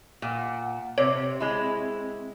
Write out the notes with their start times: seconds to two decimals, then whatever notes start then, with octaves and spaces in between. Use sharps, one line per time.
0.22 A#2 F#5
0.98 C3 C4 C#5
1.40 G#3 E4